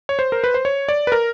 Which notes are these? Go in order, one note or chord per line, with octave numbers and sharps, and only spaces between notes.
C#5
C5
A#4
B4
C5
C#5
D5
B4
A#4